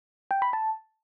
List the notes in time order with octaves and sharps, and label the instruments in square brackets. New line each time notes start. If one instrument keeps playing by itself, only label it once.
[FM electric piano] G5
B5
A5